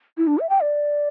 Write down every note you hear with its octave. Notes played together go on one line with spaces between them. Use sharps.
E4
D4
E5
G5
D5